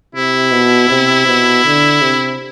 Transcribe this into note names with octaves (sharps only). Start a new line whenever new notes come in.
C3 E4
B2
C3
B2
D3
C3